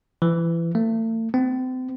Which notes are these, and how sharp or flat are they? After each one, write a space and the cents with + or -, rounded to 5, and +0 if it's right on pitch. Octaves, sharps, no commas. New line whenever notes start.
E3 +25
A3 +40
C4 -35